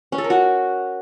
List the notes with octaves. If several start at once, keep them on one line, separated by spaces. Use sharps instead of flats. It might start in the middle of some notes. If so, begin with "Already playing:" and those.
C#4
A4
A#4
F#4